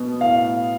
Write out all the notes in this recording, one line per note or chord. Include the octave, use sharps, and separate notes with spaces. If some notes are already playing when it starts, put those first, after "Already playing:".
Already playing: B2 B3
A2 F5